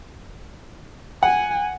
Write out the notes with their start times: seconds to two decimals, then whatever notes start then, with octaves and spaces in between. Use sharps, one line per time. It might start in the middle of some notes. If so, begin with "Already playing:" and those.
1.23 F#5 G#5